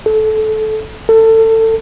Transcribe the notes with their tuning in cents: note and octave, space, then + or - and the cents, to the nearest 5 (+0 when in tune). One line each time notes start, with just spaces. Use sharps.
A4 -20
A4 +25